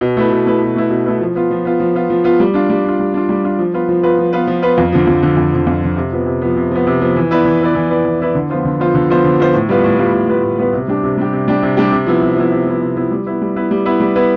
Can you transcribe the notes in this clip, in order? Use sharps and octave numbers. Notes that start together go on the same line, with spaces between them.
B2
A3 E4 B4
B2
A3 E4 B4
B2
A3 E4 B4
B2
A3 E4 B4
F3
B3 F4
F3
B3 F4
F3
B3 F4
F3
B3 F4
G3
D4 F4
G3
D4 F4
G3
D4 F4
G3
D4 F4
F3
B3 F4 B4
F3
B3 F4 B4
F3
B3 F4 B4
F3
B3 F4 B4
F2
D3 F3
F2
D3 F3
F2
D3 F3
F2
D3 F3
C3
F3 B3
C3
F3 B3
C3
F3 B3
C3
F3 B3
E3
B3 E4 B4 D5
E3
B3 E4 B4 D5
E3
B3 E4 B4 D5
E3
B3 E4 B4 D5
D3
F3 B3 F4 C5
D3
F3 B3 F4 C5
D3
F3 B3 F4 C5
D3
F3 B3 F4 C5
A2
G3 B3 F4 B4
A2
G3 B3 F4 B4
A2
G3 B3 F4 B4
A2
G3 B3 F4 B4
C3
G3 D4 G4
C3
G3 D4 G4
C3
G3 D4 G4
C3
G3 D4 G4
C3
F3 B3 E4
C3
F3 B3 E4
C3
F3 B3 E4
C3
F3 B3 E4
G3
B3 E4 B4
G3
B3 E4 B4
G3
B3 E4 B4
G3
B3 E4 B4